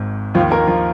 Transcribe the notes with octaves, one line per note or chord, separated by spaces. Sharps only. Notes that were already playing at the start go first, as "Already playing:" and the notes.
Already playing: G#1 G#2
D#2 D#3 F3 F4
A#3 A#4
F3 F4